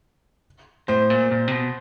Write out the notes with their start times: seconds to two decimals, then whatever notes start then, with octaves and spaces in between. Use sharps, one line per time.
0.88 A2 C5
1.10 A#2
1.31 A#2
1.48 C3
1.52 B2